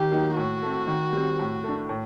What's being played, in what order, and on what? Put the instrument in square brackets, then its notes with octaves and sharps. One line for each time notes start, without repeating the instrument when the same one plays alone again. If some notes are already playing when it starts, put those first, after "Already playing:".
Already playing: [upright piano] D#3 [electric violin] G4
[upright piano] F#3 A#3 D#4
[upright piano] A2 [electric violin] F#4
[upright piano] A3 C4
D#3
G3 C4
A2
A3 D4
A2